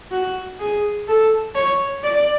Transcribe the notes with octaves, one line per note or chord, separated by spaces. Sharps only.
F#4
G#4
A4
C#5
D5